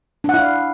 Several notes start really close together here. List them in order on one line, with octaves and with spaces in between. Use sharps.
D4 F#5 E4 F5